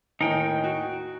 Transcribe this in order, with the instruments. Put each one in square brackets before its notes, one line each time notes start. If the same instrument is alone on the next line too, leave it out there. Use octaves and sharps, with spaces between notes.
[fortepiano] D#2 A2 G#5 [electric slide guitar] D#4 G5
[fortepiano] F#4